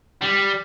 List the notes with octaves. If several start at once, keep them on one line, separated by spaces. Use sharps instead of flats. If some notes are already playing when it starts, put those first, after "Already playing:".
G3